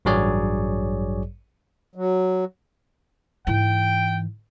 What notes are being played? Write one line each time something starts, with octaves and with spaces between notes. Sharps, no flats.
A1 G2 F#3 G#4 C#5 D5
F#3
G#2 E3 G5